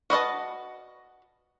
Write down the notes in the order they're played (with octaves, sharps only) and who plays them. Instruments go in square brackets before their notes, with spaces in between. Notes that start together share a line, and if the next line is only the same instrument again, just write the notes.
[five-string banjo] F#4 B4 D#5 A5